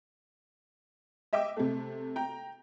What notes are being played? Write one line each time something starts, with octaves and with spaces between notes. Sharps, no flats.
D#5 E5 G5 D6
C3 A3
G5 A#5